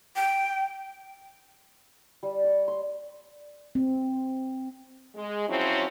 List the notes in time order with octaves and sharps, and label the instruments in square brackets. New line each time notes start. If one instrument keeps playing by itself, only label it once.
[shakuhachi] G5
[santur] G3
C#5
C6
[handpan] C4
[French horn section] G#3
F3 F#3 C4 C#4 E4